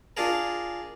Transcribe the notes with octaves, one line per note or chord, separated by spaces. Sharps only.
D4 F4 G#4 A#4